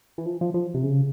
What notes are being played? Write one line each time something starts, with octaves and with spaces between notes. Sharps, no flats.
E3
F3
F3
F3
C3
C#3